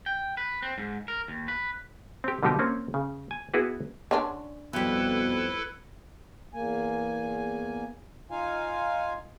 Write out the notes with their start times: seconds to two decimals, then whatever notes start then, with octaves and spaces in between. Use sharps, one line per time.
0.06 G5
0.37 B4
0.63 C4
0.78 G#2
1.08 A#4
1.28 D#2
1.48 B4
2.24 C4 G4
2.43 B2 D3 F3 G3 D#4 G4
2.59 A#3 C4 C#4
2.94 C#3
3.31 G#5
3.54 B3 E4 F#4 G#4 B4
4.11 D3 C#4 D4
4.73 F2 B2 G3 E4 A4 B4
6.54 E2 A#3 G#5
8.31 D#4 F4 F5 G#5